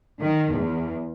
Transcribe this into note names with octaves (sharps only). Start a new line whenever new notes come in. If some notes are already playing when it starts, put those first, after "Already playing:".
D#3
E2